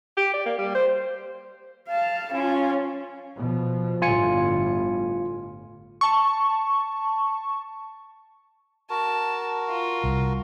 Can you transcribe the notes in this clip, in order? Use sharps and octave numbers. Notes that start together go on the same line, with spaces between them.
G4
D5
A#3
G3
C5
F5 A5
C#4 F4
B2 F3
G1 A2 F4 G#5 C#7
A5 C#6
F#4 A#4 A5
F4
C2